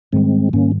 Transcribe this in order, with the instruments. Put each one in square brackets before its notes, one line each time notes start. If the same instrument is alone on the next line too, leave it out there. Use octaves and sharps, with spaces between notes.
[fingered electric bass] G#2 D#3 G3 [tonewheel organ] G#3 C4
[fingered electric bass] G#2 D#3 G3 [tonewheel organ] A#3 C#4